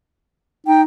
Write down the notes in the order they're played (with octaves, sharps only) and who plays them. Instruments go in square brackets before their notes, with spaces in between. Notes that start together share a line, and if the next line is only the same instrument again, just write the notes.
[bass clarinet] D#4 [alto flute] G5